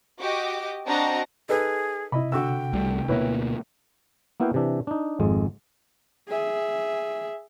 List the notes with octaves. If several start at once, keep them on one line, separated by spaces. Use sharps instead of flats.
F#4 G4 D#5 D6
C4 D4 F#4 D#5 A5 A#5
D#4 G#4 A4 B4
C3 E4 D#5 B5
D3 F#4 G5 E6
C2 G3 A3
D2 B2 A#3 E4 B4 C#5
A#3 B3 E4 F#4 F5 G5
C3 E3 D4 E5
D4 D#4
G#1 F2 G#3
G#4 E5